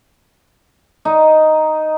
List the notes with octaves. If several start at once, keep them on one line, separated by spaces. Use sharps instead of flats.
D#4